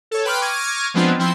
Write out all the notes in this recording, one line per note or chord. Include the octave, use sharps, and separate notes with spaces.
A4 C#5
B4 G5 B5 C6 D6 F6
C#6 D6 F6 G#6 A#6 D#7
F3 G#3 B3 C4 D4 F4
F3 C4 E4 C6